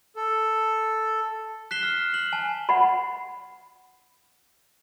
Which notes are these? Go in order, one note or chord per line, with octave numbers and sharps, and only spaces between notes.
A4
F#6 B6 C7 E7 G7
F6
F#7
G#5 A5
F#5 B5